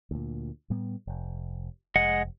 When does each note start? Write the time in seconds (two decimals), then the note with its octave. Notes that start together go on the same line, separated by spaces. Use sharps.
0.11 D2 A#2
0.70 A2 G3 B3
1.07 F1
1.96 F1 G#3 D#5 F#5